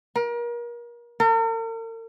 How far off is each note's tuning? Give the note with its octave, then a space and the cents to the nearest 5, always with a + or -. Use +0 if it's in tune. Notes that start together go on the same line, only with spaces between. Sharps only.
A#4 +35
A#4 -45